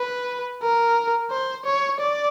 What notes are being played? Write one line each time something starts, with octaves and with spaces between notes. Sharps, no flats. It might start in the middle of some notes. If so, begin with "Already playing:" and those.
Already playing: B4
A#4
C5
C#5
D5